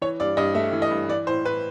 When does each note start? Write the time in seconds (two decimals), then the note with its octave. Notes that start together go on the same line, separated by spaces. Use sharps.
0.02 E3 C#5
0.20 G2 D5
0.37 G2 D#5
0.55 A3 E5
0.73 E3
0.82 D#5
0.91 G2
1.09 E3 D5
1.27 A2 C5
1.45 A2 B4